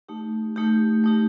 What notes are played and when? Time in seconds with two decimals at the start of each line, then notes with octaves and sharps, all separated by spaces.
0.09 A3 D#4 G4
0.56 A3 D#4 G4
1.04 A3 D#4 G4